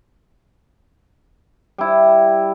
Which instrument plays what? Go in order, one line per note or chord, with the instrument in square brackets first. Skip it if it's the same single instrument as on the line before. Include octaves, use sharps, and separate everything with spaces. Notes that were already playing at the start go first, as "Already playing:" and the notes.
[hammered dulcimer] G3 E4